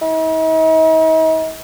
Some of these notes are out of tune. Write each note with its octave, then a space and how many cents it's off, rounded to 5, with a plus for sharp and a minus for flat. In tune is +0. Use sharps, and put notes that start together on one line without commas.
D#4 +45